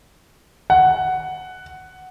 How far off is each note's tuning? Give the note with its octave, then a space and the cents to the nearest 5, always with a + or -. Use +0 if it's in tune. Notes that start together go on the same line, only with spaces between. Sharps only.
F#5 +5